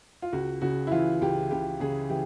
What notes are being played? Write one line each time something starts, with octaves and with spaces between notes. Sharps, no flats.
F4
C#2 F#4
C#3 F#4
E4
E3 F4
C#2 G4
C#2 G4
C#3 G#4
E3 G4